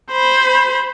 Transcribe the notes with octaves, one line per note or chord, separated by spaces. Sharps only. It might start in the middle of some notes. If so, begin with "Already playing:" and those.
C5 B5